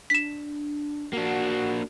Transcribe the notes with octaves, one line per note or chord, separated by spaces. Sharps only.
D4 B6 E7
A#3 D4 F#4 F#5